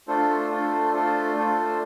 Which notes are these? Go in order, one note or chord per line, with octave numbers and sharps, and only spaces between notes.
A3 D4 F4 A4 C5
A3 D4 F4 A4 C5
A3 D4 F4 A4 C5
A3 D4 F4 A4 C5